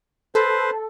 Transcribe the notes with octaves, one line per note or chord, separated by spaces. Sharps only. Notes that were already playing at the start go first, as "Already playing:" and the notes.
A4 B4 C5